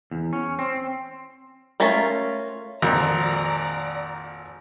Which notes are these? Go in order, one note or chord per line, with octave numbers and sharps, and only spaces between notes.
E2
C#4
C4
A3 C#4 F4 A#4
G#1 F2 A#2 D5 A#5